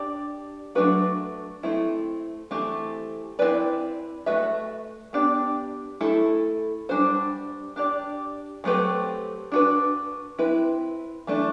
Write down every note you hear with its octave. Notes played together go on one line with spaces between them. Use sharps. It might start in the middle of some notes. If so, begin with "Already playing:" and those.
Already playing: D4 G4 D5
F#3 A3 D4 F#4 B4
A3 C4 E4
E3 A3 C4 G4
C4 E4 B4 D5
A3 D4 F#4 B4 E5
B3 D4 G4 D5
A3 E4 A4
G3 D4 F#4 C5
D4 G4 D5
F#3 A3 C4 G4 B4
D4 F#4 B4
C4 E4 B4
E3 A3 D4